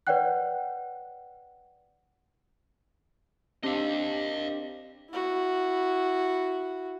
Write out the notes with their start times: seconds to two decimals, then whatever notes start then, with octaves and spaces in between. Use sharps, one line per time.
0.07 B4 C#5 D5 F#5 G5 F#6
3.63 C4 D4 G4 D#5 F5
5.10 E4 F#4